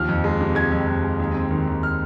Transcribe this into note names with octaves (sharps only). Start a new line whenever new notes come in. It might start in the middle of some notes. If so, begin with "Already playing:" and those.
Already playing: D#2 F3 F6
F2
G#3
C3
G#3 G#6
F2
F2
G#3
D#2
C4
D#3
D#2
F6